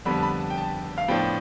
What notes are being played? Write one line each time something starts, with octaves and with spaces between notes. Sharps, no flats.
F2 D3 G3 B3 B5
A5
B5
A5
G5
A5
F5
A2 F3 B3 D4 G5